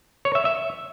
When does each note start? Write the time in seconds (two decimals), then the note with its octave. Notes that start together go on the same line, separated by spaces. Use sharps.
0.25 C#5
0.35 E5
0.45 E5